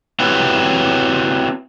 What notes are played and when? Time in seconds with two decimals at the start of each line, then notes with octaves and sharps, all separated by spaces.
0.20 C4 E4 F#4 G4 B4 C#5